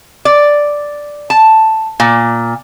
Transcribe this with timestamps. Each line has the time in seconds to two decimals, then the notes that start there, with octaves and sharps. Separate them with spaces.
0.25 D5
1.30 A5
2.00 A#2